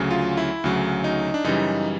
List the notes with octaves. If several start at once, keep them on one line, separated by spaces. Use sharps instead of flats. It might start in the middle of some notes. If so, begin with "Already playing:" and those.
Already playing: D2 C#3 F#3
F4
E4
D2 C#3 F#3
D#4
D4
F#2 C#3 E3 G3 D#4